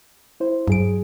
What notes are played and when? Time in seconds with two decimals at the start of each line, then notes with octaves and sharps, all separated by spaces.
0.40 E4 C5
0.67 G2 F#3 G#4 D7